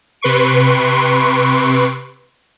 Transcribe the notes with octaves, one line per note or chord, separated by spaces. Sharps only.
C3 B4 C6 C#6 D7